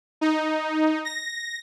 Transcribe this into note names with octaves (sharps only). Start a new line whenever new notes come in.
D#4
A#6